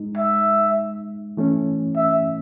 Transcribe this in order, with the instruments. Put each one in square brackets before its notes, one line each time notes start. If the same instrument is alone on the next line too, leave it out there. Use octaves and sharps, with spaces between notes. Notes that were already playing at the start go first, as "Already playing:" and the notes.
Already playing: [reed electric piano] G#3 D#4
[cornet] E5
[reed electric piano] E3 A3 C#4
[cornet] E5